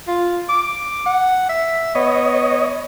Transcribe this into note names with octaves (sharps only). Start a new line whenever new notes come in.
F4
D6
F#5
E5
B3 C#5 D#5